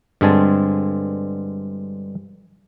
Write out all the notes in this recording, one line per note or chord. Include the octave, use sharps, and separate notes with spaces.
G2 D3 G#3 C4 G#5 A5